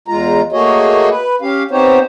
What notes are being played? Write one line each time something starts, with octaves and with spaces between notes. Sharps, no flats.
E2 G#3 F4 A#5
A3 A#3 F#4 G#4 C#5 D#5
B4
C#4 G4 F5
B3 C4 D#4 G4 C5 C#5